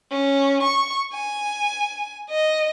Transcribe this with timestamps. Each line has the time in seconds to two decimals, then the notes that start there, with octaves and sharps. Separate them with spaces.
0.11 C#4
0.63 C#6
1.13 G#5
2.30 D#5